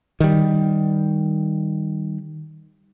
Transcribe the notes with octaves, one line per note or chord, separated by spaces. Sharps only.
D#3 G3